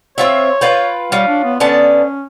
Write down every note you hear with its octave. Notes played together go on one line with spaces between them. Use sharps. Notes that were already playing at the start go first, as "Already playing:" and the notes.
C4 F4 C#5 E5
F4 B4 G5
G3 C#4 F4
D4
B3
D3 B3 C#4 A5